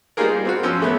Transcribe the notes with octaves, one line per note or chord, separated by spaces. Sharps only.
G3 A#3 D#4 F4 G#4 A#4
G3
C4 F4 F#4
F3 C#4 E6
E2 A3 B3